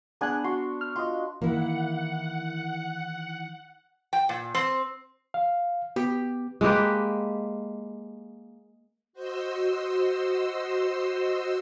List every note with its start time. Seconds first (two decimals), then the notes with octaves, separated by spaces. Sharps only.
0.21 B3 D4 G#4 D5 G#5 F#6
0.44 F#4 C6
0.81 F6
0.96 F4 D#5 C6
1.42 D#3 E3 A#3 E4 F#5
4.13 G5
4.29 A#2
4.55 C4
5.34 F5
5.96 B3 G4
6.61 G#3 A#3 G4 B4
9.13 F#4 C5 D#5 C6 E6